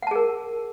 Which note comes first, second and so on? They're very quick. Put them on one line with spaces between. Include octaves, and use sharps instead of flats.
F#5 A5 G#4 A#4